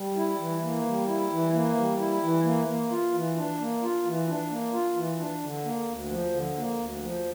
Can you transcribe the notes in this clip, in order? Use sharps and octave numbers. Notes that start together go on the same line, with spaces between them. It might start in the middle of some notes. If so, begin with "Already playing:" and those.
Already playing: G3
E4
E3
A#3
G3
E4
E3
A#3
G3
E4
E3
A#3
A#3
F4
E3
D4
A#3
F4
E3
D4
A#3
F4
E3
D4
D3
A#3
D2
F3
D3
A#3
D2
F3